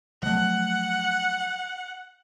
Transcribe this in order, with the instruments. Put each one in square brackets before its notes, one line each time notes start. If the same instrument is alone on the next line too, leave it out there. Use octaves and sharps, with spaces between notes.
[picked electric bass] F3 F#3 A3 [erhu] F#5